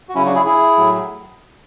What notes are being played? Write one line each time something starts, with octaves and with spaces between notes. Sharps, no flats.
F#4
C#3 F#3 C#4 E4
D4 F#4
E4 G#4
E4 G#4
A2 F#3